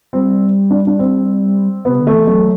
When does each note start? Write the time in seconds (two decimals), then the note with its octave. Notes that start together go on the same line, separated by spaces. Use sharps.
0.13 G3 C4
0.71 D4
0.87 D4
0.99 C4
1.85 C3 B3
2.00 D3
2.07 A3
2.14 E3
2.27 F#3 A3